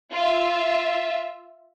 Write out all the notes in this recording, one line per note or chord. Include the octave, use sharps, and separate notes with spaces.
F4 E5